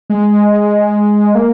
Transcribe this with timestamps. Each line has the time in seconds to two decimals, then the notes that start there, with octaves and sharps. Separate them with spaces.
0.10 G#3
1.35 A#3